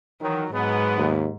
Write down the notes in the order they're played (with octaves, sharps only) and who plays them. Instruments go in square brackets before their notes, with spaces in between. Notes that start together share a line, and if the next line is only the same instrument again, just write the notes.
[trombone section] D#3 F#3 [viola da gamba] E3
[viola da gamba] G#2 [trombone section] F#3 G#3 B3
[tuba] D#2